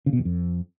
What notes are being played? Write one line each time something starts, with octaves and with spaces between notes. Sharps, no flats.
C#3
B2
E2
F2